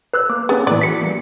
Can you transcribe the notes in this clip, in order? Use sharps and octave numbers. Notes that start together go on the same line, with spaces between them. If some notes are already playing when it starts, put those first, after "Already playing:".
B4 E6 F#6
A#3 D6
B3 C#4 G#4
A2 E3 D5
F#4 B6 C#7
G3 A#3